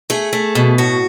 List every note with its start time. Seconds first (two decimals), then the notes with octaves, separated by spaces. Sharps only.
0.10 A3 G#4
0.33 A3
0.55 B2
0.78 A2 F#4